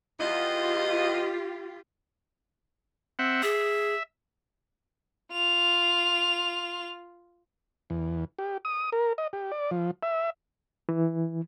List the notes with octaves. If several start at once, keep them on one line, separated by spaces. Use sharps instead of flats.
E2 F4 G4 D#5
C4 E5 F#5
G#4 E5
F4 F7
E2
G4
D#6
A#4
D#5
G4
D5
F3
E5
E3